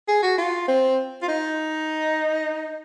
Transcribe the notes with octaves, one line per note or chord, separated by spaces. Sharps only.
G#4
F#4
F4
C4
F4
D#4